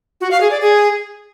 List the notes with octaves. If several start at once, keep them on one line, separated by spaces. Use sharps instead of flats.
F#4
F5
G#4
D5
G#4